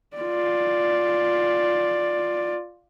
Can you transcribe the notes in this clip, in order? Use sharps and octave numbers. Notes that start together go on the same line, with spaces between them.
F4 D5